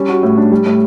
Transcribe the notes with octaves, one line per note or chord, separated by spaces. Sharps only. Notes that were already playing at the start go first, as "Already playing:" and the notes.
Already playing: G3 C#4
F#4
A2
D4
G3
A2